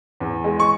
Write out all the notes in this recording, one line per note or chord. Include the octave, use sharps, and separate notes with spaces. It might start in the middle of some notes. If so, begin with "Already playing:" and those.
E2
G#3
C#6